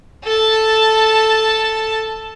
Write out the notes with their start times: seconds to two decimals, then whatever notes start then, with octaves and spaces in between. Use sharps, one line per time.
0.24 A4 A5